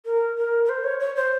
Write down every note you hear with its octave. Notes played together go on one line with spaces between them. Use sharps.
A#4
A#4
A#4
C5
C#5
C#5
C5